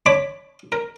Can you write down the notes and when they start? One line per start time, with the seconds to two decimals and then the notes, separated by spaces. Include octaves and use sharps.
0.06 D4 C#5 B5 D6
0.72 A#4